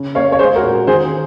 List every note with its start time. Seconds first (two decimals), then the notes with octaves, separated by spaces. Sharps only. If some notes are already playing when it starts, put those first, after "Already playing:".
Already playing: C#3 C#4
0.15 A#3 C#5 F5
0.32 C#5
0.39 G#3 G#4 C5
0.56 F#4 A#4
0.63 A#2
0.87 D#3 G#4 C5